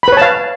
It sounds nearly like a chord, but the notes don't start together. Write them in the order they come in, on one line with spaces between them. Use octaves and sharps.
B5 B4 C#5 A5 F5